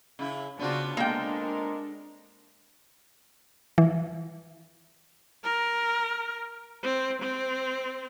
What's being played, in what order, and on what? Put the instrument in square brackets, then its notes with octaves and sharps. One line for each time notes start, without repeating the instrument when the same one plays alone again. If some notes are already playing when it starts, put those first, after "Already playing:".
[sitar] C#3 E4
[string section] C#3 D4 [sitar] B3 C4 F4 [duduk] F#4
[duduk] G#3 [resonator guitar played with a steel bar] A#3 G5 [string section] D4 A4 A#4
[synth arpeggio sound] E3
[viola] A#4
C4
C4